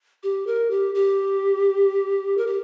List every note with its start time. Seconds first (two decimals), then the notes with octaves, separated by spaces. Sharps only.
0.23 G4
0.47 A#4
0.71 G4
0.95 G4
2.37 A#4
2.47 G4